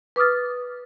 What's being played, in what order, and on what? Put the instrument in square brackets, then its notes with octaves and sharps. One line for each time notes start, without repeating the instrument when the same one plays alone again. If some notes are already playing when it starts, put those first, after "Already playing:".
[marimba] B4 D6 D#6 F6 A6